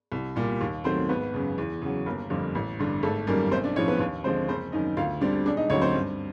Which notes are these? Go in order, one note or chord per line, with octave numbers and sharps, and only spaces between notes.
C2
A#2 G3
D#2
D#3 F#3 A3 C4 C5
G#1 B3 B4
F#2 C#3
E2
C#3 F#3
G1 A#3 A#4
F2 D3 G3
A1
G2 D3
G#1 A3 A4
F#2 D#3 G3 A#3 A#4
B1 C4 C5
D4 D5
A2 F3 C#4 C#5
B3 B4
D#2
D3 F3 G#3 C4 C5
F#1 C4 C5
F#2 D#3 D#4 D#5
D2 F4 F5
D3 G3 C4 D4 D5
E1 D4 D5
D#4 D#5
D2 D3 F#3 C#4 C#5
C4 C5
G2